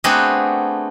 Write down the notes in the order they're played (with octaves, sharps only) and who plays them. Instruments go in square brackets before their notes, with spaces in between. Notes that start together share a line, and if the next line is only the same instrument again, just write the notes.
[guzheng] A3 B3 C4 D4 F#4 G#4